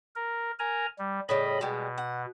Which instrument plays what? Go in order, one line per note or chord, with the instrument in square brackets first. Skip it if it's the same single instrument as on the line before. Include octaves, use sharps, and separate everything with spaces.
[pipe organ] A#4
A#4 G#5 A#5
G3
[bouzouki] A2 C#3 G3 [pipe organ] D#5 B5
[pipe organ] B2 [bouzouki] G3 G#3
[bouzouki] F#5